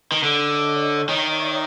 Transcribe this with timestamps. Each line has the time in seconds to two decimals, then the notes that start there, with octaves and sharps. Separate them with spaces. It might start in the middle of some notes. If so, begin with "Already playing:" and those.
0.12 D#3
0.23 D3 C#5 D#5
0.52 C#5 D#5
0.80 C#5 D#5
1.09 D#3 D5 E5